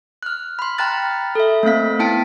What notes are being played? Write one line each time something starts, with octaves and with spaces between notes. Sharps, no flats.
F6 F#6
B5 C6
G5 A#5 B5 F6 F#6 A6
A4 E5
A3 A#3 C4 F5 B6
B3 E4 G5 A5 B6 D7